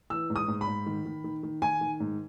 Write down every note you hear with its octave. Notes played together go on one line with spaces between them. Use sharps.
E3 E6
G#2
D#6
G#2
B5
G#2
D#3
D#3
D#3
D#3
D#3 G#5
D#3
G#2